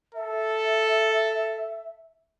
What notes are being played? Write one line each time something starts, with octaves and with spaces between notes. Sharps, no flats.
A4 E5